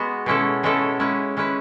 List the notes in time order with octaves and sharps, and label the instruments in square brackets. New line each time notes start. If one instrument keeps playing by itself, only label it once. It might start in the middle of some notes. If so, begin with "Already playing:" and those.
Already playing: [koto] G#3 B3 F#4
B2 G#3 C#4 E4 A4
B2 G#3 C#4 E4 A4
G#3 C#4 E4 B4
G#3 C#4 E4 B4